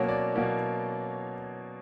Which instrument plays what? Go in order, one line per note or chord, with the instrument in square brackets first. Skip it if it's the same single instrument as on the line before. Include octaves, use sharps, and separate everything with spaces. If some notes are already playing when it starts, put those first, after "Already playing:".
Already playing: [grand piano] B2 F#3 A#3 C#4 C#5
D5
B2 F#3 A#3 C#4